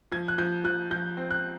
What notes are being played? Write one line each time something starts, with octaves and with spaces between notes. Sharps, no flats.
F3 G#6
F#6
F3 G6
F3 F#6
F3 G6
C4
F#6